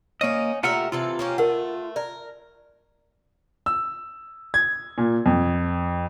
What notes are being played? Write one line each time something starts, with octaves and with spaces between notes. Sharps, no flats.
A#3 C#4 D#4 D#5
A3 F4 G4 A#4 E5 F#5
C3 E3 F4 A4
A#3 C#4 G4
A3 A#4 F#5
A#4 D5
E6
G#6
A#2
F2